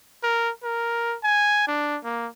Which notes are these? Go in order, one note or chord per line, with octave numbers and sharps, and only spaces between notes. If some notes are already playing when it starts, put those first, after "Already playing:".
A#4
A#4
G#5
D4
A#3